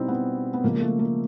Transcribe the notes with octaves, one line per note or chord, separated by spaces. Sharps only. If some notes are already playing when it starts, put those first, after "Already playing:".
Already playing: B2 G3 C4 D#4 E4
B3
B3
C#3 F3 G#3 A#3
A#3
A3
A#3